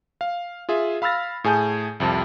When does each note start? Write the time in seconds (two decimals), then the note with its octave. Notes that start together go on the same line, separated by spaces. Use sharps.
0.21 F5
0.69 F4 G#4 E5
1.02 F5 B5 E6 F6 A6 A#6
1.44 A2 G#4 G#5 A5 G6
2.00 C2 F2 C3 A5